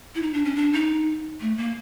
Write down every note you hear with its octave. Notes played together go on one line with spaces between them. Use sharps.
E4
D#4
D4
C#4
D4
D#4
A3
A#3